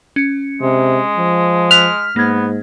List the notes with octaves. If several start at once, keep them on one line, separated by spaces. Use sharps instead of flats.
C#4 C#7
C3 G#3
F3
F6 F#6 B6
G#2 A#3 B3 G#6